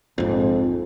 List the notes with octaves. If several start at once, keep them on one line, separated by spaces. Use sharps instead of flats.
A#1 F2 G#2